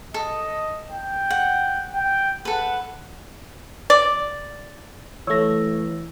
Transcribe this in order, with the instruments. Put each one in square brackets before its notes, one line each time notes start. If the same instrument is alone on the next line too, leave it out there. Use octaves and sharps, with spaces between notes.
[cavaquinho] A4 [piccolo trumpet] D#5
[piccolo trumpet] G5
[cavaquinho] F#5
[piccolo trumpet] G5
[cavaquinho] A4 B4 [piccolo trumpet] F#5
[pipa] D5
[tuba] E3 [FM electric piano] A3 C#5 [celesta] E6 A#6